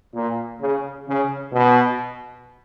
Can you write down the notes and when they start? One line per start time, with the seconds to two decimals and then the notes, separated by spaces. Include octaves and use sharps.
0.15 A#2
0.60 C#3
1.07 C#3
1.52 B2